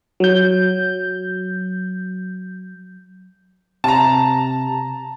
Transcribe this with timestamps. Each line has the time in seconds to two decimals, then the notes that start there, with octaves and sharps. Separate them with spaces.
0.20 F#3 G6
3.84 C3 A5 A#5